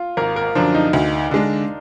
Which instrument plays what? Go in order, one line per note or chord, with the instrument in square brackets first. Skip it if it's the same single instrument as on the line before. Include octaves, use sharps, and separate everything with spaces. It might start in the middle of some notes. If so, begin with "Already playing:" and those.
Already playing: [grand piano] F4
[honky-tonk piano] G#1 [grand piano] A#4
[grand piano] A#4
[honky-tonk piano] F#2 D3 F3 [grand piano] D4
[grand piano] D#4
[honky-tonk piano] D2
D3 G#3 D4